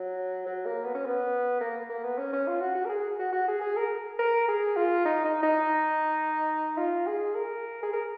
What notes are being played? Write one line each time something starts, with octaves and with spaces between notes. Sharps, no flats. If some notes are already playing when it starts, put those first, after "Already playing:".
Already playing: F#3
F#3
A#3
B3
C#4
B3
A#3
A#3
B3
C#4
C#4
F4
F#4
F#4
A#4
G#4
F#4
F#4
G#4
G#4
A#4
A#4
G#4
F4
D#4
D#4
D#4
F4
G#4
A#4
G#4
A#4